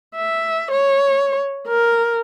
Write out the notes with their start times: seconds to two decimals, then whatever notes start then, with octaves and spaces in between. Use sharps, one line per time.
0.15 E5
0.71 C#5
1.67 A#4